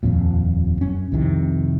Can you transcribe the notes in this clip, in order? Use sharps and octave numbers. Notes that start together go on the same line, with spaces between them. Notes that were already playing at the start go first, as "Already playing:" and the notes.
D#1 F2 A#2
F#2 C#4
C2 F2 C3 D#3